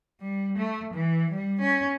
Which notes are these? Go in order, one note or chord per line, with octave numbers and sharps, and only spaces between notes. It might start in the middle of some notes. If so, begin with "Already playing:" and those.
G3
A3
E3
G3
C#4